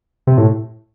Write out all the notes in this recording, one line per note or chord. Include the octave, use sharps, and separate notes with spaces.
C3
A2